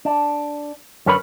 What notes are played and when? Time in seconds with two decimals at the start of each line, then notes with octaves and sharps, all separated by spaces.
0.05 D4
1.06 F#2 D3 A#4 B4 C#5 B5